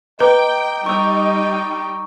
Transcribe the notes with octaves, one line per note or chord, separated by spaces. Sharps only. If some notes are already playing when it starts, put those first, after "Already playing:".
B4 D#5 G5 A#5 D6
G3 D#4 G5 C#6 E6